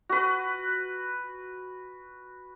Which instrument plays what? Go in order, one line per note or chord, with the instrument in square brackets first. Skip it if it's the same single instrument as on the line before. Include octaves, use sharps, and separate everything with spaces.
[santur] F#4 B4